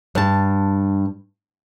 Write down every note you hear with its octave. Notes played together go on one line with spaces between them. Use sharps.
G2 A5